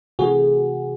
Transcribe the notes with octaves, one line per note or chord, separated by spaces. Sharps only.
C3 E3 A3 F#4 G#4